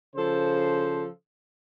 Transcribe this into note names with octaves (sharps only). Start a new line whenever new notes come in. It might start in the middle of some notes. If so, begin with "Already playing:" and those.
C#3 F3 A4 C5